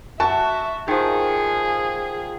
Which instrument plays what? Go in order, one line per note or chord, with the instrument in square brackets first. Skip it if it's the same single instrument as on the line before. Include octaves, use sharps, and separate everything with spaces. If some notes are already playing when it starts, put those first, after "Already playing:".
[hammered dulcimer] F#4 [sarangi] E5 [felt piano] A5
[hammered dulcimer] D#3 F3 [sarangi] G#4